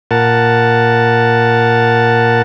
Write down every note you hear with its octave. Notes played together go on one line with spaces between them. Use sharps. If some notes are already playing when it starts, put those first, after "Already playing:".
A#2 A#4 F#5 A5